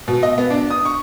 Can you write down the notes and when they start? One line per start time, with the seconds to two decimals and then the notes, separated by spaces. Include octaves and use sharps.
0.08 B2
0.23 D#5
0.38 B3
0.50 D4
0.70 D#6
0.85 C#6